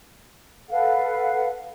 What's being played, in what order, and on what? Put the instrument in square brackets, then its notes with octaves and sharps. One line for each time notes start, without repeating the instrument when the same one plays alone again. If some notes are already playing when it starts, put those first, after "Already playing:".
[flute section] A4 B4 F5 F#5